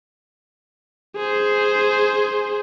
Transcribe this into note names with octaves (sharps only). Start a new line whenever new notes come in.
G#4 C5